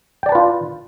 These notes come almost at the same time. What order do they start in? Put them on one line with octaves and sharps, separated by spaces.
G5 D5 A5 B4 F4